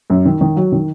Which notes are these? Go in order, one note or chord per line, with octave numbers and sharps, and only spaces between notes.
F#2
D#3
D#3
F#3
D#3